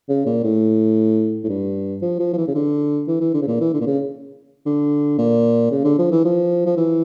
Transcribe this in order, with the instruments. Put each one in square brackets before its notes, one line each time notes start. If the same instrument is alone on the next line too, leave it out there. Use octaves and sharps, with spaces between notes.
[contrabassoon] C#3
A#2
A2
A2
G2
F3
F3
F3
E3
C#3
D3
E3
E3
D3
C#3
A#2
E3
D3
A#2
C#3
D3
A#2
C#3
D3
F3
E3
F3
F3
E3